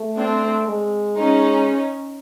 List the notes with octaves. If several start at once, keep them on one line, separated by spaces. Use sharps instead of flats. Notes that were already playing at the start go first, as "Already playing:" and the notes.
Already playing: A3
C4 D4
G#3
G#3 C#4 D#4